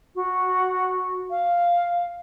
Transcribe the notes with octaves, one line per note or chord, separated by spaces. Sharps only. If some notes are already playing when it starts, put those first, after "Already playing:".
F#4
F5